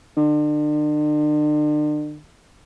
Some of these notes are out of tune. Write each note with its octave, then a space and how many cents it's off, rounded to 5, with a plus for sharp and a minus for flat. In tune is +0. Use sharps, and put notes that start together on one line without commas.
D3 +40